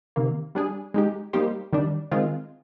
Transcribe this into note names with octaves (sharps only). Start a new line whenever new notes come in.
C3 D#3 A#3
G3 D4 G#4
G#3 D#4 G4
G3 A#3 D#4 G4 C5
D#3 G3 D4
D#3 G#3 C4 F4